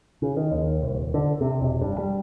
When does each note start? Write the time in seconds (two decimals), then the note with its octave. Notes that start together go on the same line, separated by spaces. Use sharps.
0.22 C#3
0.37 D#3
0.51 D#2
0.82 C2
0.95 D#1
1.14 D3
1.41 C3
1.60 E1
1.81 G2
1.98 G3